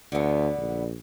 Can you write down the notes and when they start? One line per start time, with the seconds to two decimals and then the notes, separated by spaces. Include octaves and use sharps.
0.12 D2 D3 B3
0.58 A#1